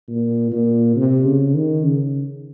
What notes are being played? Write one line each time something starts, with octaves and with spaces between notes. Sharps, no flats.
A#2
A#2
C3
C#3
D#3
C#3